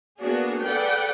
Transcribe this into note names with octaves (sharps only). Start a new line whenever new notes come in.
A#3 B3 D4 F#4 G#4
G#4 A4 B4 D5 F#5 G5